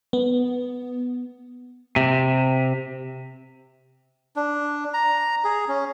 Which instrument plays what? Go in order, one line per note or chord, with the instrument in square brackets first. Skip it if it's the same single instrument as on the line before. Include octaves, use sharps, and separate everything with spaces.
[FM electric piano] B3
[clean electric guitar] C3
[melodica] D4
A#5
G#4
C#4